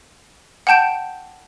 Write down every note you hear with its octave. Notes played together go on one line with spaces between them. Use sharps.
F#5 G5 A5 G6 D7